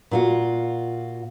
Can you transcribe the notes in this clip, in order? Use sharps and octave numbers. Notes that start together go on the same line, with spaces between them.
A#2 F4 F#4